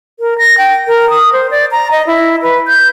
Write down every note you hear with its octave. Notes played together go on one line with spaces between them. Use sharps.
A#4
A#6
G5
A#4
D#6
C5
D5
A#5
D#5
E4
B4
G6